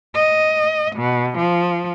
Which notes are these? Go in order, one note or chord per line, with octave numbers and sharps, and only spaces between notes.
D#5
B2
F3